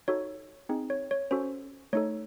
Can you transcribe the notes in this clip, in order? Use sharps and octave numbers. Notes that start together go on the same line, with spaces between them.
D#4 F#4 A4 C#5
C4 D#4 G#4
C#5
C#5
C#4 F#4 A4 C5
A3 D#4 A4 C#5